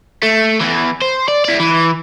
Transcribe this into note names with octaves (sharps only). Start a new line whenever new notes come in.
A3
E2 E3
C5
D5
E4 D5
E3